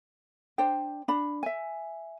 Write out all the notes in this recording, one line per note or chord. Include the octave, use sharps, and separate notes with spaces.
D4 C5 G5
D4 B5
E5 G#5